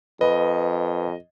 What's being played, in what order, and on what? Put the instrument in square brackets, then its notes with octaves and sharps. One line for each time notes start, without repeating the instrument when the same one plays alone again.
[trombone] F2 [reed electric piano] B4 [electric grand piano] D#5